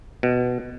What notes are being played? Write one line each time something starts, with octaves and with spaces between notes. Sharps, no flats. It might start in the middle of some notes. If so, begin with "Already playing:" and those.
B2